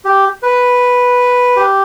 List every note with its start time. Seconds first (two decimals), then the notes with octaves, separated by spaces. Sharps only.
0.05 G4
0.43 B4
1.57 G4